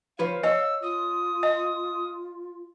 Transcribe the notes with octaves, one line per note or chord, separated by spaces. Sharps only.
F3 B4 C#5 F5
C#5 D#5 E6
F4 D#6
D#5